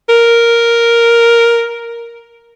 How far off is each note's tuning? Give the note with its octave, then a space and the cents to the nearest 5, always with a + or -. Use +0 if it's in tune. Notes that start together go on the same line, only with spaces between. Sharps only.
A#4 +0